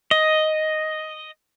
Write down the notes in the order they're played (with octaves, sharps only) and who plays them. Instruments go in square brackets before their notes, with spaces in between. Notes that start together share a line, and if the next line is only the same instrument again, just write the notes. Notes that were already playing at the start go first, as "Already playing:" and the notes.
[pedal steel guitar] D#5